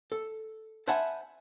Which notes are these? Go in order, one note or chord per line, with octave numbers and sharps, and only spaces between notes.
A4
C5 E5 F#5 G#5 A5 B5